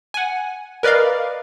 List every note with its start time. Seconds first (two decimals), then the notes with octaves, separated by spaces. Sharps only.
0.14 F#5 G#5
0.83 A#4 B4 D5 D#5 F5